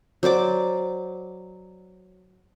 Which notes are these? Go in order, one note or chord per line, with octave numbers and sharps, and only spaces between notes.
F#3 C5 D5 D6